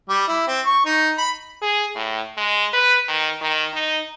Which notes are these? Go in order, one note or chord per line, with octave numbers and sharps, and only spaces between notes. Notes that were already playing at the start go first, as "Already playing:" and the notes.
G3
E4
C4
C#6
D#4
B5
G#4
A2
G#3
B4
D#3
D#3
D#4